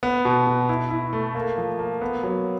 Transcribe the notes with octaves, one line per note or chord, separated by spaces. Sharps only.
B3
B2
B2
E4
E4
A3
A#3
F3
A#3
B3
F#3